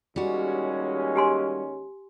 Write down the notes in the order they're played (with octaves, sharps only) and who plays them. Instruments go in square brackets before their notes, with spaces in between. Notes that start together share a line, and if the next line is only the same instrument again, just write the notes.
[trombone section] D#2 G#3 C#4 [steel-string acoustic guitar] G3 F#4
[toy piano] G4 G#5 C6